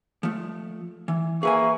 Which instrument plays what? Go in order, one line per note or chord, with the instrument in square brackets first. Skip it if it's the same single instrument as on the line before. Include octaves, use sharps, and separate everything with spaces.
[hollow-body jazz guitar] F3 A3
E3
[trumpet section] A#3 E5 C#6 [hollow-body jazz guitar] G#4 B4 G#5